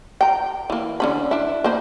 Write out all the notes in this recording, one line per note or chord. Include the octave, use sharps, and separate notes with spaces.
G5 A#5
E3 A#3
D3 C#4 B5
D4 E4
A#3 C5 B5